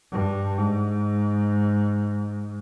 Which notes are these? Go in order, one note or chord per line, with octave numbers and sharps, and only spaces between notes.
G2
G#2